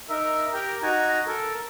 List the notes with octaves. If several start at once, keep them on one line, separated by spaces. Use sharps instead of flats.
D#4 A#4 E5
G4 A#4 G5 A#5
D#4 F#4 G#5 A#5
A4 A#4